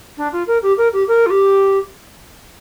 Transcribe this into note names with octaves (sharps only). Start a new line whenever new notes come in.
D4
F4
A#4
G4
A#4
G4
A#4
F4
G4